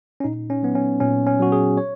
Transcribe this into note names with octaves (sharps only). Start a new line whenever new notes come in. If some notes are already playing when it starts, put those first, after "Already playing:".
C#4
A#2 D#4
C#4
F#3 B3
C#4
A#2 C#4
C#4
F#3 F#4
G#4
C#5